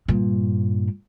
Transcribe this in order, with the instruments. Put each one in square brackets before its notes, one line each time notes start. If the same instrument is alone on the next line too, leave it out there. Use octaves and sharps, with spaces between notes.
[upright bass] G2 A#2